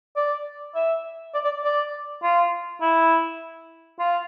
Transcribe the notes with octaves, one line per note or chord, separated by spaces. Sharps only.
D5
E5
D5
D5
D5
F4
E4
F4